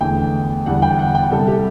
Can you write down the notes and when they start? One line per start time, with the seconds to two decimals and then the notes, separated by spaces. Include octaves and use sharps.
0.01 E2 D3 A3 G5
0.66 E2 D3 G3 F#5
0.82 G5
0.99 F#5
1.15 G5
1.31 C2 C3 G3 A4
1.48 G4